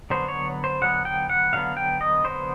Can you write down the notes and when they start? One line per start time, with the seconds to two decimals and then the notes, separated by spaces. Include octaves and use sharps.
0.10 D3 F#3 B3 C5
0.28 C#5
0.64 C5
0.82 D3 F#3 B3 F#5
1.05 G5
1.30 F#5
1.53 D3 F#3 B3 F5
1.77 G5
2.01 D#5
2.24 D3 F#3 B3 C5